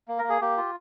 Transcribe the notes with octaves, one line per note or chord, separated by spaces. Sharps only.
A#3
A#4
A#3
G#4
A#3 G4
F4